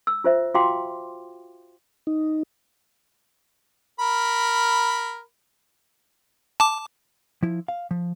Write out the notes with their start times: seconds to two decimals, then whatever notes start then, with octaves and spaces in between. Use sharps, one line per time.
0.07 E6
0.24 F4 C5 E5
0.54 F4 F#4 F5 G5 C6 D6
2.07 D#4
4.00 A#4 B5
6.60 A5 D6
7.43 F3 E4
7.68 F5
7.91 F3